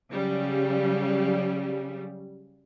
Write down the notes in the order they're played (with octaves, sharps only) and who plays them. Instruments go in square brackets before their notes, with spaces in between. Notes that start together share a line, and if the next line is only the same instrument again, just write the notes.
[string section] C#3 F#3 G3